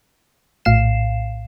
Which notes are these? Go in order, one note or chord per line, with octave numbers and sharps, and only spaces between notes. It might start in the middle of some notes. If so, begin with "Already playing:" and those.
A#1 A2 F5 C7 E7